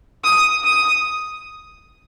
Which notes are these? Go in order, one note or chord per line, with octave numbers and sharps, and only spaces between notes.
D#6
D#6